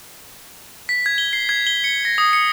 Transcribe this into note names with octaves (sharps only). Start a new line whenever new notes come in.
B6
G#6
G7
C7
G#6
G7
C#7
A#6
D#6
C#7